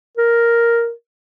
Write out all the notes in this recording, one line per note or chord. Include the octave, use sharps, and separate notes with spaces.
A#4